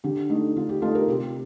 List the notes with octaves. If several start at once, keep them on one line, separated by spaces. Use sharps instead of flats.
D3 G4
A3 D#4
D3 F4
G4
A3 D#4 F4 A4
G4 A#4
C3 G4